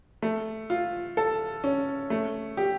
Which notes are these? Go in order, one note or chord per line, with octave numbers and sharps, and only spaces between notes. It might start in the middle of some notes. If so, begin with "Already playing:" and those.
A3
F4
A4
C#4
A3
G4